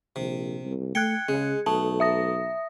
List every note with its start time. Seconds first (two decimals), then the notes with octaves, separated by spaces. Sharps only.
0.16 A#1 C3
0.65 C2
0.95 A3 G5 F#6 G#6 C#7
1.28 C#3 G#3
1.66 B1 A3 A5
2.00 E5 D#6 A#6